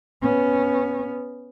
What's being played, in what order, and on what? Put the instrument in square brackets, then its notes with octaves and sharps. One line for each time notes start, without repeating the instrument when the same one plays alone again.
[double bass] B3 C#4